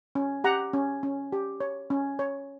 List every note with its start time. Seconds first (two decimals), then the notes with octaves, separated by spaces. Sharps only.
0.15 C#4
0.44 G4 F#5 A#5
0.73 C#4
1.03 C#4
1.32 G4
1.60 C#5
1.90 C#4
2.19 C#5